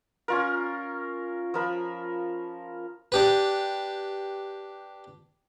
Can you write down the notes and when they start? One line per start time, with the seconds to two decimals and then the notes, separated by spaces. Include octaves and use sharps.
0.28 C#4 F4 A#4
1.54 F3 A#4 B5
3.12 D4 G4 B4